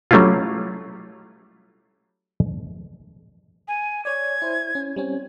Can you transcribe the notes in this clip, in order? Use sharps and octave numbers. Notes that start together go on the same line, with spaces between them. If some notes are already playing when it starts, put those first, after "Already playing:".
F#3 G3 A3 C#4 E4 F4
G#5
C#5 D5 G#6
E4 C5
C#4
G3 C4 C#4